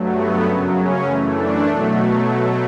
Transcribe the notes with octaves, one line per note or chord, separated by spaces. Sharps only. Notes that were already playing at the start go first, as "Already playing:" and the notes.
Already playing: G2 F#3 A3
B3
F#2 C#3 F#3
C#4
F#2 E3 A3
D4
B2 F#3 A3